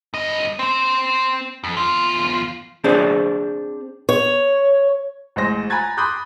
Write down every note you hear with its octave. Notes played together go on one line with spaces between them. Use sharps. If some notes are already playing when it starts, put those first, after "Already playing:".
G2 D#5
C4 C5
F2
E2 F4
C4 D4 G#4 C5 D5
C#5
A1 G#3 C5 A#6
G#5 A#5 B5 F#6 G#6 A6
B5 C6 D6 D#6 F#6 G6